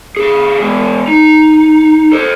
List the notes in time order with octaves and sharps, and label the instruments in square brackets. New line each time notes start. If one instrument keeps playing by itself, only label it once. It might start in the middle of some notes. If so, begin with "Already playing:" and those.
[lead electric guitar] D3 G#4
E3 G#3
D#4
A4 C5